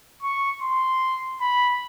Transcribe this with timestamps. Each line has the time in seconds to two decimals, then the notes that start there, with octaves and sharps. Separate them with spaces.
0.23 C#6
0.62 C6
1.41 B5